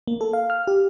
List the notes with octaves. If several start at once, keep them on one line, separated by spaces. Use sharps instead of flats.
A#3
A4
F5
F6
G4